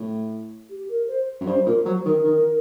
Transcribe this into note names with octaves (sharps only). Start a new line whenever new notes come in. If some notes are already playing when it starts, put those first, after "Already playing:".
Already playing: A2
G4
A#4
C5
F#2
G2 C5
A#2 A#4
F#3 C5
D#3 A#4
D#3